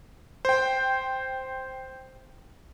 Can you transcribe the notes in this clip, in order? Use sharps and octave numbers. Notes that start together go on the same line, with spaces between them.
C5 G5